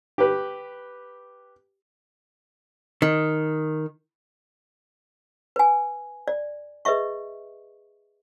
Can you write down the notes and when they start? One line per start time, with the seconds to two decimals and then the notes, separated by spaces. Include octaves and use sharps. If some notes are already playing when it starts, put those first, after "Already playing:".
0.18 G4 B4
3.02 D#3
5.56 B4 G#5
6.28 D5
6.85 G#4 B4 D#5 E5 C#6